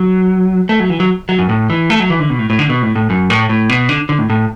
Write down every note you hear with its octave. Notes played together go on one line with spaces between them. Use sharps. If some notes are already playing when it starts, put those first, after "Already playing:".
Already playing: F#3
A3
F#3
E3
F#3
F#3
F#2
A2
E3
A3
F#3
E3
D3
B2
A2
A2
D3
B2
A2
A2
F#2
A2
A2
B2
D3
D3
A2
A2